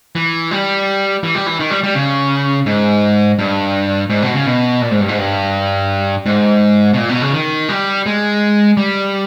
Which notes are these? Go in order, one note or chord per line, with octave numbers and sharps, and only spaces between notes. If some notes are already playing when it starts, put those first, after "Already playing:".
E3
G3
E3
G3
E3
D#3
G3
G3
C#3
G#2
G2
G#2
B2
C#3
B2
A#2
G#2
G2
G#2
G2
G#2
B2
A#2
B2
C#3
D#3
G3
G#3
G3